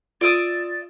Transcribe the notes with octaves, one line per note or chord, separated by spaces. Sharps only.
F4 D5 E5 D#6 A6